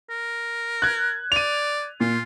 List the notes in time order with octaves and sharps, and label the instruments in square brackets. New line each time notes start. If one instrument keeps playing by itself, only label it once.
[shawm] A#4
[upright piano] F#6 G#6
[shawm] D5 [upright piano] D#7 F7
[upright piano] A#2 [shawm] F4